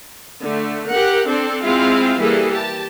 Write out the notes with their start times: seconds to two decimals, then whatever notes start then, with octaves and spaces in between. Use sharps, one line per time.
0.42 D3 A3
0.91 G4 A#4 F#5
1.25 C4 D4 A4
1.63 G#3 C4 E4 F4 F5
2.17 E3 G3 A#3 E4 G#4 A4
2.53 G4 A5